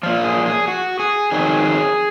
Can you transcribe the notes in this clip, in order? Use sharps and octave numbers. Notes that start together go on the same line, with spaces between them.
A#2 F3 F4
G#4
G#4
F#4
G#4
F2 D#3 F#3 G#4